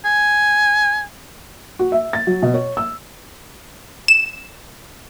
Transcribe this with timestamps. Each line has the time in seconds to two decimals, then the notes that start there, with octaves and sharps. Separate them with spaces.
0.05 G#5
1.79 F#4
1.92 E5
2.13 A6
2.27 F#3
2.42 B2
2.54 C#5
2.77 E6
4.08 E7